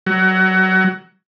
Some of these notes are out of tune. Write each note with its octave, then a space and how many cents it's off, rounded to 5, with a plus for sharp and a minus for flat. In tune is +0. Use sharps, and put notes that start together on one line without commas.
F#3 +25